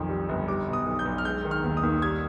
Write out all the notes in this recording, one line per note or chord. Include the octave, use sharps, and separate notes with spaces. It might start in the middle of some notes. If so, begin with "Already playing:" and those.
Already playing: B1 F2 D#3
G3
G1
G3 D6
B2
D#6
B1
G6
B1
F6
G#3 G6
D#3
F6
D#2
D#6
D#2
G3 G#6